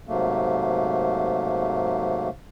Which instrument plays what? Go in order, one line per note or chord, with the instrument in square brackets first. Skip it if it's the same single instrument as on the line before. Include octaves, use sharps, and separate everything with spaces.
[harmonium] G#2 C3 F#3 A3 A#3